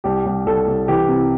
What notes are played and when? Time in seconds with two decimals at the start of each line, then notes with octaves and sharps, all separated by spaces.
0.04 C2 G4
0.26 C2
0.46 C2 A4
0.67 C2
0.88 E3 G4
1.09 C3